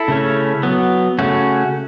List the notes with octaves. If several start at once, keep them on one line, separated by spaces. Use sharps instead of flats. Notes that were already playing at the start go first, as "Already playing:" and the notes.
Already playing: E4 A4
C#3 A3 C#4
F#3 B3
C#3 A3 C#4 F#4